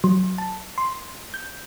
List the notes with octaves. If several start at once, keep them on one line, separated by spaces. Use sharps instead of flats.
F#3
A5
C6
G6